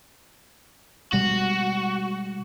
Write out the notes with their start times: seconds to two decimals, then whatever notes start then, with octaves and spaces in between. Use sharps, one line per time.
1.13 B2 G3 G#3 F#4